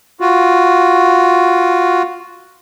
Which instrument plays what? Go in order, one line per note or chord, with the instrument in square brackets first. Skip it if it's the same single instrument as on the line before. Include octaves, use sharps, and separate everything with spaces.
[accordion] F4 F#4